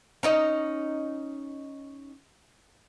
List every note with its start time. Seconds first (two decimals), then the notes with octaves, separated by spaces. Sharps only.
0.23 C#4 D#4 D#5